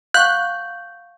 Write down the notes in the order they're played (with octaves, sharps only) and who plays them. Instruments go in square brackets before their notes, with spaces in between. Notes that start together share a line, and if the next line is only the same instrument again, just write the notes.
[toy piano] F5 F#5 C#6 [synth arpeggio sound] F#6 [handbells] G6